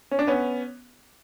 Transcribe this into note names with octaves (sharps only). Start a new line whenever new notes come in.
C#4
D4
B3 C#4